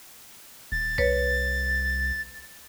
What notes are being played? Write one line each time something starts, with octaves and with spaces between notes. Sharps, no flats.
D#1 A6
C2 B4 C#5